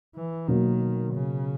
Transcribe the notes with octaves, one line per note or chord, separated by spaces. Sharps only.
E3
B2 D#3 F#3 A#3
C#3